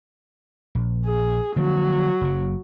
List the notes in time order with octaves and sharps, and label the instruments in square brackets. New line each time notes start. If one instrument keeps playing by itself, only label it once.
[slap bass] A#1
[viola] G#4
[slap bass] D3 F3 A#3 [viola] F#3
[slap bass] F#1 C#3